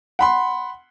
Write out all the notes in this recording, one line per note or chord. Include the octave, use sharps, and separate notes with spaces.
F#5 B5 C6